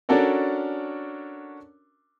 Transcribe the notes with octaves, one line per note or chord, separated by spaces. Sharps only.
C#4 D4 F#4 A4 A#4 D5